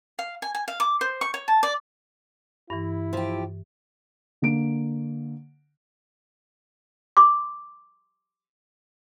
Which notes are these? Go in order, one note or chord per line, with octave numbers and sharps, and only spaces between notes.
F5
G#5
G#5
F5
D6
C5
C#6
C#5
A5
D5
G2 E3 E4
F3 G4
D3 A#3 D7
C6 D6